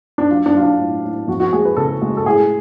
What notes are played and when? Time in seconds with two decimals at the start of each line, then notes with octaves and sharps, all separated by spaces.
0.18 D4
0.30 F#3 F4
0.46 D4
0.55 F#3 F4
0.63 D4
0.80 A2
1.04 A2
1.28 F2 F#4
1.40 F#4
1.52 G#3 G#4
1.65 B4
1.77 C#3 A4
2.02 G#3
2.17 A4
2.25 A2 G#4